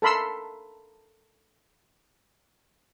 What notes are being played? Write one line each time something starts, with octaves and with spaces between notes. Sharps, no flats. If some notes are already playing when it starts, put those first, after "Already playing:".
A4 A#4 B5 C6 E6